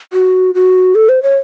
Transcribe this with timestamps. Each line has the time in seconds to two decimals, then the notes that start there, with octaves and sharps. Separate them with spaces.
0.13 F#4
0.55 F#4
0.95 A4
1.09 C5
1.23 C#5